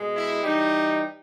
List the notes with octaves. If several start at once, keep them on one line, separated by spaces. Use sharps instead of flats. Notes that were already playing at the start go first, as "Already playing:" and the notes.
Already playing: B2 G#3
E4
E3 G3 D#4